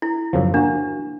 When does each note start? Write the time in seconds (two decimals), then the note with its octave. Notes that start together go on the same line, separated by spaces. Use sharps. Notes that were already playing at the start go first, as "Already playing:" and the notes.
0.02 E4
0.33 F#2 C#3 F3
0.54 A#3 D4 F#4